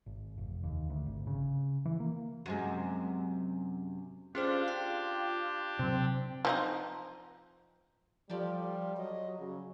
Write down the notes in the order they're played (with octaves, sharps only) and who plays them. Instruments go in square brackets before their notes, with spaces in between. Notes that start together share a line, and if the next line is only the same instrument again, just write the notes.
[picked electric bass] G#1
F1
D#2
D2
G#1
C#3
E3
A#3
[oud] F#2 C3 G#3
[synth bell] C#4 G#4 C5 [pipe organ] D4 G4 [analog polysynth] F4
[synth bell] G5
[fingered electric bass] C3 F#3 [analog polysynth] C4
[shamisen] F3 C4 D#4
[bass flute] F3 [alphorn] G3 [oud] G4 A4 D5
[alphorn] F#3 [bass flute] D#5
[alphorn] C#3 [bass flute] F#3